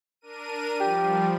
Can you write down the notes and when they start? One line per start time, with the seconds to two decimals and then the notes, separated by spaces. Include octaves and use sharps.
0.21 D4 A#4 D#7
0.80 F3 G3 G4